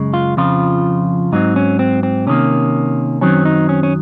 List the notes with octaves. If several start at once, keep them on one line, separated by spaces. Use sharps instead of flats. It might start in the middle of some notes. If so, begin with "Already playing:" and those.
Already playing: F#2 C#3 G#3
F4
F2 C#3 F3 F4
G#2 F#3 C4 D#4
C#4
C4
C4
C3 D#3 A#3 C#4
F#2 D#3 F#3 C4 C#4
D#4
C#4
C#4